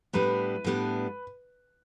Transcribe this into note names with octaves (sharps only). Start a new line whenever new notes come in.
A2 G3 B3 D4 B4
A2 G3 B3 D4